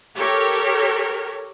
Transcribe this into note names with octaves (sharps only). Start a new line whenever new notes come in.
G4 A4 A#4 C#5